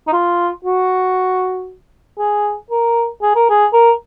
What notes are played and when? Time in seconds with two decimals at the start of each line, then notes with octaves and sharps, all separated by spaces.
0.07 D#4
0.13 F4
0.65 F#4
2.19 G#4
2.71 A#4
3.22 G#4
3.35 A#4
3.49 G#4
3.73 A#4